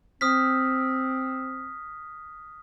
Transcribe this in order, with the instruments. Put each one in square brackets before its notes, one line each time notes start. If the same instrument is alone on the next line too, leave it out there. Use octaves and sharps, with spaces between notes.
[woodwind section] C4 [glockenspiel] D#6 F6 B6